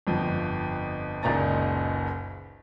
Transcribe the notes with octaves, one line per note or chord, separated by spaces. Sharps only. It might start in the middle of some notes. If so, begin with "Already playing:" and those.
G1 F2 F3
F#1 C#2 A#2 D#4 A#5 A6